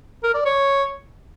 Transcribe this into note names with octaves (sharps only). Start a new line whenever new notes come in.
A#4
D5
C#5